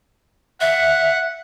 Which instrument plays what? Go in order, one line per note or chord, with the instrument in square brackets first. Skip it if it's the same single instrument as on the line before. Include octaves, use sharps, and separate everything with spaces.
[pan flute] E5 [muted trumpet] F#5